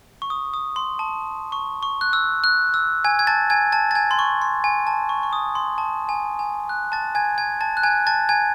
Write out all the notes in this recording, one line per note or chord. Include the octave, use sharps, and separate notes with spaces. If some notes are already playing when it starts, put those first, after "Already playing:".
C#6
D#6
D#6
C6
A5
C#6
C#6
F#6
E6
F#6
E6
G#5 G#6
G#6
A5 A6
G#5 G#6
A5 A6
A6
G#5 G#6
C6
C#6
C6
G#5
A5
C#6
C#6
D#6
C6
A5
G#5
G#5
F#6
A5 A6
G#5 G#6
G#5 G#6
A5 A6
F#6
G#5 G#6
A5 A6
G#5 G#6